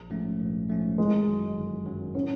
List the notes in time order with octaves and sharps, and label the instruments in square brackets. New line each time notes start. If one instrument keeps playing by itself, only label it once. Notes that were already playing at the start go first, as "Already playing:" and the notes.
Already playing: [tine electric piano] A#1
G#2 F3 A3 C#4
A#1
G#2 F3 A3 C#4
[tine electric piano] G1 [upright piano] G#3
[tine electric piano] F#2 D#3 F#3
G1
F#2 D#3 F#3
[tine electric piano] A2 [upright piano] C#4